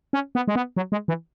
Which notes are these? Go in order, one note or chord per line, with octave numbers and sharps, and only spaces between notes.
C#4
B3
G#3
B3
F#3
G#3
E3